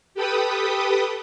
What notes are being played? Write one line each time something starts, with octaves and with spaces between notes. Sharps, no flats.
G4 A4 B4 G5 B5 D#6